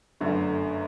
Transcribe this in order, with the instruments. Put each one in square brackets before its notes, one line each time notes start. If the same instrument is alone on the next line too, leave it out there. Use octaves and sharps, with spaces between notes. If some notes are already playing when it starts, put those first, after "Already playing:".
[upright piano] G1 F#2 D3 A3